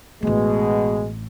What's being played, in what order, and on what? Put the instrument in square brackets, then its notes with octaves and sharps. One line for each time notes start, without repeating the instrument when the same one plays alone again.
[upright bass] A1 A3 [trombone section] B2 G#3